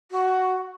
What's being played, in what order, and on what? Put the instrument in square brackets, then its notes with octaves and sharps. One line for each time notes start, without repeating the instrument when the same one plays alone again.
[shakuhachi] F#4